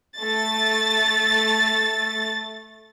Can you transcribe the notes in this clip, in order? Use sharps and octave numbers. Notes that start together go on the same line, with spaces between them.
A3 A6